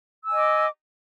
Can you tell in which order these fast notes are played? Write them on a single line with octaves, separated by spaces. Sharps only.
E6 G#5 D#5 D6